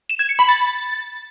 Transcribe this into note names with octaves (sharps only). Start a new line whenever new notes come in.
E7
G#6
C#7
B5
A6